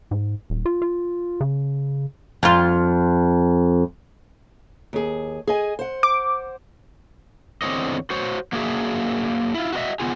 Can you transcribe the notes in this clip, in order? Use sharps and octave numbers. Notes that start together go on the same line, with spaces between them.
G#2
D#1
F4
F4
C#3
F2 F4
D#2 G#4
G#4 D#5 G#5
C5 F#5
D6
E2 D3 C4 D#4 C#5 D#5
F#4 C5 C#5
F#3 A#3 D4 F#4 G#4 E5
E4 F4
F#4 G4 A#4 D#5 E5
B3 F4 G#4